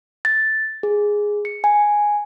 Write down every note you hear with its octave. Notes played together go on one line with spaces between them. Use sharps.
A6
G#4
C#7
G#5